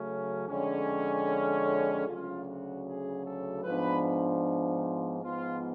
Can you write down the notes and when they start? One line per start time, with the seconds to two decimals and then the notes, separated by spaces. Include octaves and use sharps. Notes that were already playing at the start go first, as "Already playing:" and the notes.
Already playing: C#3 F#3 A3 C#4
0.49 F2 D3 G#3 C#4
1.28 C#5
1.68 F4
2.07 D2 C#3 F#3 C#4 F4
2.46 F#4
2.86 G#4
3.24 A4
3.64 G#2 F3 B3 D4 B4
5.22 G#2 F3 B3 F4